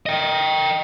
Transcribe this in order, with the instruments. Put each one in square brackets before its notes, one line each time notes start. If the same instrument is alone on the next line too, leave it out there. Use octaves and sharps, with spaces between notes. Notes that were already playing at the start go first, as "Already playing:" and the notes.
[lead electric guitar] D#5 G5